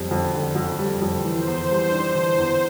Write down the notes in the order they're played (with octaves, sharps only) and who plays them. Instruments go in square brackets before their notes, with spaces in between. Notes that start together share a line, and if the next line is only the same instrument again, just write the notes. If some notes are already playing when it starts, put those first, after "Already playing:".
Already playing: [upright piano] F2 G3
F2
D3
F2
G3
F2
[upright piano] E3 [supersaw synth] C5
[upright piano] E2
G3
D4
E3
E2